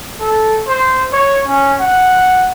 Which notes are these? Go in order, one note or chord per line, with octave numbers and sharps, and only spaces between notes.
A4
C5
C#5
C#4
F#5